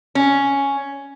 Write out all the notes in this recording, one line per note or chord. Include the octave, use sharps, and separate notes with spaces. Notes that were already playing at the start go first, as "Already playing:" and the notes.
C#4